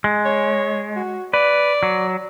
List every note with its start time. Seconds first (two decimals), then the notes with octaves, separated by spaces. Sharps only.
0.04 G#3
0.25 C#5
0.96 F#4
1.34 B4 D5
1.83 F#3